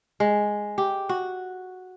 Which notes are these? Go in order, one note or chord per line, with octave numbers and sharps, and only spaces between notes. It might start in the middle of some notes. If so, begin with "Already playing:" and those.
G#3
G4
F#4